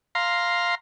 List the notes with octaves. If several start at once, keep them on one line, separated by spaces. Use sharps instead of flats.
F5 A#5 C6